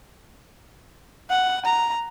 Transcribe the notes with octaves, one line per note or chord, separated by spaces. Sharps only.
F#5
A#5